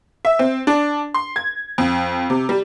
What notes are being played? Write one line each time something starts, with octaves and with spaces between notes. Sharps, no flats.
E5
C4
D4
C6
G#6
F2
C3
G3